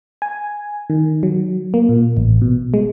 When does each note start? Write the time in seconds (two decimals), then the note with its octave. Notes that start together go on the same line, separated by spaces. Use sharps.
0.22 G#5
0.90 D#3
1.23 F#3
1.74 A#3
1.89 A#2
2.17 A1
2.42 B2
2.74 G#3